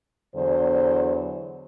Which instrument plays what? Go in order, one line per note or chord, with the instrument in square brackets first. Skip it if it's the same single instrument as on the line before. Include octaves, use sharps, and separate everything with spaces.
[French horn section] E2 D3 F#3 C5